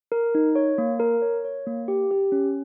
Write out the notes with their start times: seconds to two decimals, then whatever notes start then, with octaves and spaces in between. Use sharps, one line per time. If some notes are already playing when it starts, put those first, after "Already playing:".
0.12 A#4
0.35 D#4
0.55 C#5
0.78 A#3
1.00 A#4
1.22 C#5
1.45 C#5
1.67 A#3
1.88 G4
2.11 G4
2.32 C#4